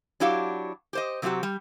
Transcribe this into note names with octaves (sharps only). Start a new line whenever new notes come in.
F#3 D4 E4 F#4 G4 F5
G4 C5 D#5
C3 F#3 C4 D#4 F#4 G4
G3